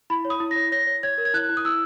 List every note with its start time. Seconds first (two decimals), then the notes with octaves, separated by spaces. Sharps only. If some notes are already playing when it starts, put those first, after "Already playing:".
0.10 E4 B5
0.25 C#5
0.30 D#6
0.40 E4
0.51 C#5 A#6
0.72 C#5 A#6
0.87 C#5
1.03 C#5 G#6
1.18 A#4
1.25 G#6
1.34 E4 F#6
1.49 E4
1.57 D#6
1.65 E4 E6